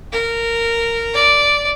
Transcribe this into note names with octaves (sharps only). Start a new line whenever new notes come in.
A#4
D5